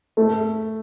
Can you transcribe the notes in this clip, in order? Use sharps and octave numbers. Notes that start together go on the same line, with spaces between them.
A3